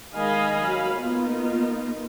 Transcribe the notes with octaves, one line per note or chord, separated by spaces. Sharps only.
D#3 G#3 D#5 F5 G#5 B5
F#3 F5 B5
A#3 B3 D#4 F4